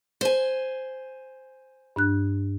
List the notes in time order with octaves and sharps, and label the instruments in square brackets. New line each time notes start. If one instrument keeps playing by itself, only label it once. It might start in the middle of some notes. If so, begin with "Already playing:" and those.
[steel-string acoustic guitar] C5 G#5
[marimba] G2 D4 F#6